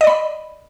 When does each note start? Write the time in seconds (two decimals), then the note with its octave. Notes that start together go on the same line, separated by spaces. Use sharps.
0.01 D#5
0.04 D5
0.07 B5